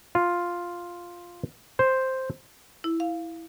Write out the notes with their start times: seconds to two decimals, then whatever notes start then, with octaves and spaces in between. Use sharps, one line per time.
0.15 F4
1.79 C5
2.84 E4
3.00 F5